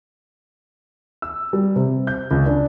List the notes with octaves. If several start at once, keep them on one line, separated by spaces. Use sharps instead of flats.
E6
G3
C3
G6
C#2
D4